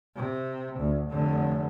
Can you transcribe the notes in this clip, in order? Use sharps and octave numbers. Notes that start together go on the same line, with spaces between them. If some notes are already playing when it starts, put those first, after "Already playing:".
C3
D2
F1 D3